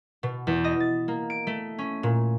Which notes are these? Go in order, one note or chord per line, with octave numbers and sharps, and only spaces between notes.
B2
E2
D#5
A6
A#3
D7
A3
C#4
A#2